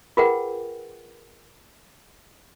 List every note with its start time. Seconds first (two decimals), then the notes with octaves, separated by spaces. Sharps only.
0.17 F4 G#4 A#4 B4 F#5 G5